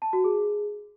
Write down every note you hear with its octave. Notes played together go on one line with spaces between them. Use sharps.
A5
F#4
G#4